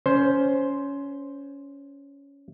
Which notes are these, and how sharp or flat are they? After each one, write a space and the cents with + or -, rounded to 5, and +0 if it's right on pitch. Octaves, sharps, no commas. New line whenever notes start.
C#4 +15 C5 +0